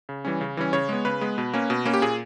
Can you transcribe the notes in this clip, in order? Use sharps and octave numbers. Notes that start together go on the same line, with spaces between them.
C#3
E3 G3 C#4
C#3
E3 G3 C#4
C#3 C#5
G#3 B3
C#3 B4
G#3 B3
B2
A#3 C#4
B2
A#3 C#4
G4
A#2 G#4